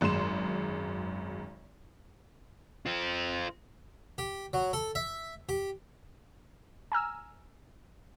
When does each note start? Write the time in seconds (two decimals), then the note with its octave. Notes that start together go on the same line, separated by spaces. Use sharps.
0.01 G#1 F#2 G#3 C6 E7
2.86 C4 F4
4.18 G4
4.53 F#3
4.73 A4
4.95 E5
5.49 G4
6.92 G#5 A#5 E6 F6